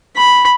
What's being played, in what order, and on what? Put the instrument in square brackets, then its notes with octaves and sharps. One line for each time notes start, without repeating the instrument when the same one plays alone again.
[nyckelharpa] B5